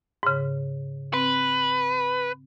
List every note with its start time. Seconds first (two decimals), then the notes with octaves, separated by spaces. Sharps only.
0.23 G#2 C#3
1.14 C4 B4